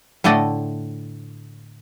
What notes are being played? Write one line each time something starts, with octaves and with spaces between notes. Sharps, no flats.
A2 D3 A3 D5 D#5